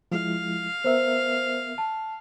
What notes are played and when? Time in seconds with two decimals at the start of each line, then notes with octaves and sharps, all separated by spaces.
0.12 F3 G#3 E4 F5
0.84 B3 A#4 C5 E5
1.78 A5